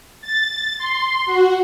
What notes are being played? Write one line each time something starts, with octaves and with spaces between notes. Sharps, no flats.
A6
C6
F#4